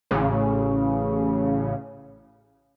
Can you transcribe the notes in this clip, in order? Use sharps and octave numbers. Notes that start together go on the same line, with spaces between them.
A1 C#3